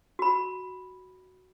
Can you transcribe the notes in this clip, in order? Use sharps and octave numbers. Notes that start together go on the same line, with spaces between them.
F#4 B5